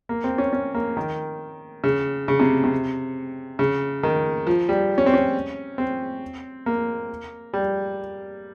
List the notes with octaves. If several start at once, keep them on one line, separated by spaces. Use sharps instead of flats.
A#3
C4
C#4
C#4
A#3
D#3
C#3
C#3
C3
C3
C#3
D#3
F3
G3
C#4
C4
C#4
C4
A#3
G3